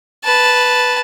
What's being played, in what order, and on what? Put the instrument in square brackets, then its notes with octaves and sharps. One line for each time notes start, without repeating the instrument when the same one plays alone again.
[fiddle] B4 A5